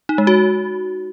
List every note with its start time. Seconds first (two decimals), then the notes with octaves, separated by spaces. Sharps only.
0.09 D#4
0.18 G#3
0.27 F#4